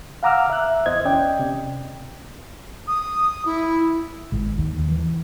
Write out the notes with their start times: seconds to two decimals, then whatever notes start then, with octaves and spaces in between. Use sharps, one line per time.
0.23 F5 F#5 A#5 D6 E6 F6
0.50 E5 F#6
0.86 E2 E3 C5 D#5 G#6
1.05 D2 C#4 D5 D#5 G5
1.39 C3
2.87 D#6
3.45 E4
4.32 G#1
4.58 D#2
4.88 E3